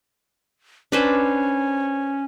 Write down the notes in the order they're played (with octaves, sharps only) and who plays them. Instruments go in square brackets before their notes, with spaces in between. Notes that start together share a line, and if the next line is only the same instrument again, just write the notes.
[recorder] C#4 [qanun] D4 B4 C5